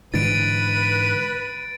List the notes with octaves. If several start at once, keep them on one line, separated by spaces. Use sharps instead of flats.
G#2 D3 E3 B4 A6 D7 D#7